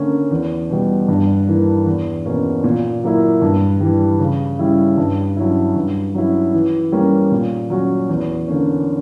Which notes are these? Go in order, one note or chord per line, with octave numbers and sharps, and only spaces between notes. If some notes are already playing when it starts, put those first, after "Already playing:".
Already playing: D3 A#3 C#4
E2
B2 G3
G2
E3 A#3 D4
E2
B2 A#3 C#4
A#2
F#3 A#3 E4
G2
E3 G3
C#3
G3 C#4 E4
G2
F#3 C#4 E4
G2
F#3 C#4 E4
E3
G3 A#3 C#4
A#2
F#3 C#4 F#4
E2
D3 A#3 C#4